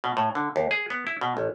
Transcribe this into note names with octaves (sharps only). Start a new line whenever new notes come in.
B2
A2
D3
D#2
G#4
B3
E4
B2
A1